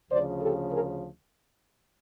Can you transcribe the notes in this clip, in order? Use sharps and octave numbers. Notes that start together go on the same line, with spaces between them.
D2 C#3 F3 C5 D5
G4 A4
G#4 A#4